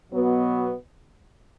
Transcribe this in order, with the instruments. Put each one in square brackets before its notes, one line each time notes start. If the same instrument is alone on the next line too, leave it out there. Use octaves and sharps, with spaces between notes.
[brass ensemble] B2 F#3 B3